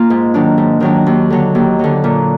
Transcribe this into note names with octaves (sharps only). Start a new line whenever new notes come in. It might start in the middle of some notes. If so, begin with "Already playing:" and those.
Already playing: A#3 F4
G#2
D#3 F#3 D4
G#2
D#3 F#3 D4
D#2
D3 F#3
D#2
D3 F#3
A#2